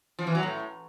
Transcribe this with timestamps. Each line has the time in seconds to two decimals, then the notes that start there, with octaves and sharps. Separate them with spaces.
0.19 F3
0.27 E3
0.35 F#3
0.43 A2